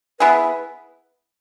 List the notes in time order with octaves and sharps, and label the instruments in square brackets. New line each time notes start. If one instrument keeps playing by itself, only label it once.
[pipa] B3 E4 G#4 [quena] B4